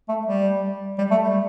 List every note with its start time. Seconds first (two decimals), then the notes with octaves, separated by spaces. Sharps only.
0.09 A3
0.27 G3
0.98 G3
1.11 A3
1.23 G3